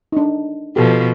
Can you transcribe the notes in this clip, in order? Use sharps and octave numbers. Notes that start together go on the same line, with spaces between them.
D4 D#4
B2 F3 G4 A4